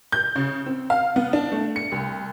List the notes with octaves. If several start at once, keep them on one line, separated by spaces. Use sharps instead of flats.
G6
C#3
C4
F5
B3
D4
A3
C#7
C2